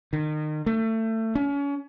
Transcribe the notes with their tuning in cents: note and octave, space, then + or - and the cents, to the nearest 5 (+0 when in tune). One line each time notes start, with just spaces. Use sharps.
D#3 -30
A3 +25
C#4 +35